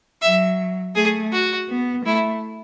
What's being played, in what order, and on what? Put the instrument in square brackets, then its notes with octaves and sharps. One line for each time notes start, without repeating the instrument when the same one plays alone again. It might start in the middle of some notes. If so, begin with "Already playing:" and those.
[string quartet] F#3 [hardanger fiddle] E5
[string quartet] A3 [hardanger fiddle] G#4
[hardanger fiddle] F#4
[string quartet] B3
[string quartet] A3 [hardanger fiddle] E4